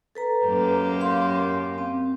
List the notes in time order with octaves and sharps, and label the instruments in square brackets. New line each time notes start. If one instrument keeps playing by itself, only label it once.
[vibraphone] A4 B4 A#5
[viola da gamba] F#2 A#3 G4
[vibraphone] F5 C6
C4